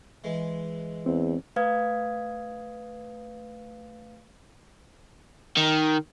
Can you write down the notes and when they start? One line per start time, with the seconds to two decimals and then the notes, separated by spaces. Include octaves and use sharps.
0.24 E3 G#3
1.06 E2 C4
1.56 A3 B4 F5 D#6 G#6
5.57 D#3